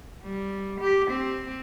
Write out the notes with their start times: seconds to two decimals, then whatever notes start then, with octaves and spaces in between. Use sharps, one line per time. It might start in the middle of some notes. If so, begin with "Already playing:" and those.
0.23 G3
0.81 G4
1.11 C4